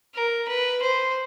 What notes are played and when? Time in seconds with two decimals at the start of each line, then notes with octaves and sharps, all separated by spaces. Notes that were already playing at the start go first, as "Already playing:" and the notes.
0.15 A#4
0.48 B4
0.83 C5